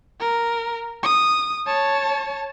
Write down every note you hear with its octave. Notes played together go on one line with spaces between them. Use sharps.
A#4
D#6
C#5 A5